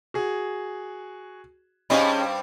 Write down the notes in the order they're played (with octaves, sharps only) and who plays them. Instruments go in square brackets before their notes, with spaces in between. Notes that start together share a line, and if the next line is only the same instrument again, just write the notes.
[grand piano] F#4 G#4
[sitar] G2 G3 C4 [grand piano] C#4 B5 [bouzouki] D#4 G#4 F5